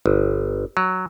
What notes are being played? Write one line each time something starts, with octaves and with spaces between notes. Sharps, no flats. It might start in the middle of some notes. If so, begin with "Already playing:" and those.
G1
F#3